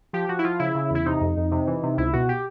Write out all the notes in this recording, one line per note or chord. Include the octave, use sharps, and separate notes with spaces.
F3 G4
F3 F#4
E4
F3 F4
C#3 E4
C#3
E2 E4
C3 D#4
F2
F2
C3
E3
C3
C#2 E4
B2 F#4
G4